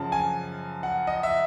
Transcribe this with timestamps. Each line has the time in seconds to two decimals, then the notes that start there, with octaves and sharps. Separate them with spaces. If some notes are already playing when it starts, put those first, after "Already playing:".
Already playing: F#2 C#3 F3 A5
0.12 G#5
0.83 F#5
1.07 D#5
1.23 E5